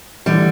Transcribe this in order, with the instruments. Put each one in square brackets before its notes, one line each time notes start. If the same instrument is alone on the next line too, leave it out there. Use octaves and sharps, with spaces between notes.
[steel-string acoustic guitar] D3 G3 [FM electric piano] E3